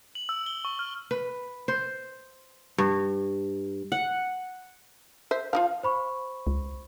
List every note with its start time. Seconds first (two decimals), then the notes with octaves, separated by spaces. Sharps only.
0.15 F#7
0.29 E6
0.47 G7
0.65 C#6
0.79 F6
1.11 B4
1.68 C5
2.78 G2
3.92 F#5
5.31 C5 E5
5.53 F3 D#4 F4 F5
5.83 C5 B5 C#6
6.47 C#2